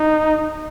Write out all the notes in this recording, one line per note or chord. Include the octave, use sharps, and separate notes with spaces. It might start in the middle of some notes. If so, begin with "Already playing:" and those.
Already playing: D#4